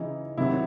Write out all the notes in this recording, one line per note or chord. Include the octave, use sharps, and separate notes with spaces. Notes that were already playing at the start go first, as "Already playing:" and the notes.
Already playing: C#3 E3 D#4
C3 D#3 F#3 E4